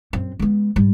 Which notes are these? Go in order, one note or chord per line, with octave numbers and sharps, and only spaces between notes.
F#2 C4
G#3 B3
G#2 G3